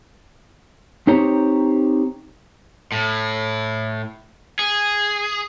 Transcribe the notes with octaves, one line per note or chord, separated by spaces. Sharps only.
C4 D#4 G4 C5 C#5 A#5
A2
G#4